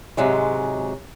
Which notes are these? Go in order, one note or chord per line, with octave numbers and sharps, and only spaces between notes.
G#2 C3 F#3 G#3